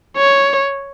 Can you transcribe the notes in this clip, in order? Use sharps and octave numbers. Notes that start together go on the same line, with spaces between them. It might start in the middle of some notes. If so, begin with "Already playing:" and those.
C#5